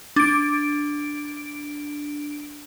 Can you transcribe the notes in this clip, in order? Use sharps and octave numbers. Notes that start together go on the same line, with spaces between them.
D4 D7